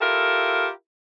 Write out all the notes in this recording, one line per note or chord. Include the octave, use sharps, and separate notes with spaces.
E4 F4 G4 A4 A#4